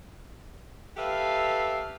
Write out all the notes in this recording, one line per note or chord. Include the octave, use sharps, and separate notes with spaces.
G4 A4 B4 E5 F5